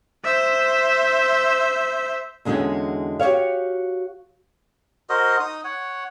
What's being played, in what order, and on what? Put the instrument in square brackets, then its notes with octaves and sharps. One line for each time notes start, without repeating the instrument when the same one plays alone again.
[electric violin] C5 E5
[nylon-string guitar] E2 D3 G#3 C#4 F#4 G5
F#4 G4 A4 C#5 F5
[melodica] F#4 A#4 C5 D#5
D#4 D#6
C#5 F#5